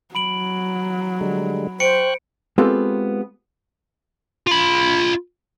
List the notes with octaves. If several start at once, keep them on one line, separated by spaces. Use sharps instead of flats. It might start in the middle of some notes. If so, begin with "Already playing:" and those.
F#3 B5 D7 F#7
D3 G3 G#3
C5 G5 C#6 F#6 C#7 D7
G#3 B3 C4 F4 G4 A4
F4 B5